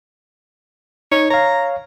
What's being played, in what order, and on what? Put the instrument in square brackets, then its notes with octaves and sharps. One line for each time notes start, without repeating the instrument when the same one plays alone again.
[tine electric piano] D#4 [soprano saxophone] C#5
[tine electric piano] C#5 F5 [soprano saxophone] A#5